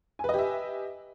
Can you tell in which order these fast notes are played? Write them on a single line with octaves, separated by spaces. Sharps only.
G#5 B4 D#5 G4 E5